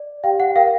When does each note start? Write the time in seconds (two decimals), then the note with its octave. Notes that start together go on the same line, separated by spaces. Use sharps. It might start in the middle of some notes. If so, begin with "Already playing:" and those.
Already playing: D5
0.24 G4 F5 G5
0.40 F#5
0.56 A#4 F5 G5